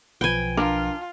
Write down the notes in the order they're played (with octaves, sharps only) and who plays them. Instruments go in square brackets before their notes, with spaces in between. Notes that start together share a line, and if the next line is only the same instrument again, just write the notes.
[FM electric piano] B1 F3 B4 [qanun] G5 G#5
[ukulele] D4 A#4 [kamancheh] F4